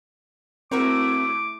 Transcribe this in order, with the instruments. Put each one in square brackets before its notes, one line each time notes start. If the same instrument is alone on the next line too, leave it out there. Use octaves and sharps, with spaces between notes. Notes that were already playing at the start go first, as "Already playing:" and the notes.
[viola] A3 E4 [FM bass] C4 [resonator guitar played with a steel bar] F#4 A#4 C#5 [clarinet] D6